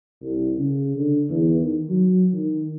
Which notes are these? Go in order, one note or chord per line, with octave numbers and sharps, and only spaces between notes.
C2
C#3
D3
E2
D#3
F#3
D#3